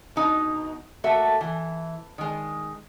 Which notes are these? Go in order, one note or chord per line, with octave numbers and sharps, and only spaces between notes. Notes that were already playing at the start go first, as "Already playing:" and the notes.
B2 D#4
A3 A#3 F#4 A4 E5
E3
D#3 G#3